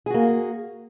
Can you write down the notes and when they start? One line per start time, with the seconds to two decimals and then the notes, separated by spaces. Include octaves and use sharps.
0.06 G#4
0.10 F#4
0.14 A#3